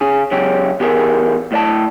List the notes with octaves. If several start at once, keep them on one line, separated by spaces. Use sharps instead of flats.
C#3 G#4
F#2 C#3 C#4 G4
E2 G4 G#4 A#4
A2 D5 A5